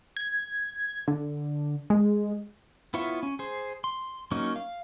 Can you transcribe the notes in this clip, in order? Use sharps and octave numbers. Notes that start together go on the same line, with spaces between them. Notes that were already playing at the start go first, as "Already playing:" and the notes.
G#6
D3
G#3
B3 E4 F4 C#5 E5
C#4
G#4 C5
C6
F#3 A#3 C#4 D#4 C#6
F5